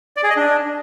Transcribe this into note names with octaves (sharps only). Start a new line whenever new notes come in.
D5
G#4
D#5
D4